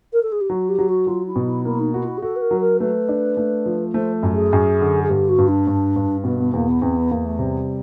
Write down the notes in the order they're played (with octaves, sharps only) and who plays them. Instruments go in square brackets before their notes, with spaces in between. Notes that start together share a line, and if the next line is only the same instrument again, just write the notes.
[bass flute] A#4
A4
G#4
G4
[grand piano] F#3 [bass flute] F#4
[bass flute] G4
[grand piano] F#3
[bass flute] F#4
[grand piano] F#3 [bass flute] F4
[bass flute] E4
[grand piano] B2
[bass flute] E4
[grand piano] A#3 [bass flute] E4
[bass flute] D#4
[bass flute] E4 [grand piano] F#4
[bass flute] F4
E4
G#4
[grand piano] F#4 [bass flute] A4
[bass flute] B4
A#4
[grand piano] F#3
[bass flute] A#4
[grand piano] A3 [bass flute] B4
[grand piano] D4
A3
F3
[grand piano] A3 [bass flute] C5
[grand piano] F#2
[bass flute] G#4
[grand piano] F#2
D3
[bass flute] G#4
[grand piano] G2 [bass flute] G4
[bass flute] F#4
[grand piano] G2
[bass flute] D4
[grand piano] G2
G2
[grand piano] B2 [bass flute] B3
[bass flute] B3
[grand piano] E2 [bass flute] A#3
[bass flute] B3
[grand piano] E2 [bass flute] C4
[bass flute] B3
[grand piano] E2 [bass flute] A#3
[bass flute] A3
[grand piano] C3 [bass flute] G3